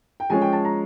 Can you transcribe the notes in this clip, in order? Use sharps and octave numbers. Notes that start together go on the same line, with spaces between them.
G5
F3 G#3 C#4 G#5
G5
A5
A#5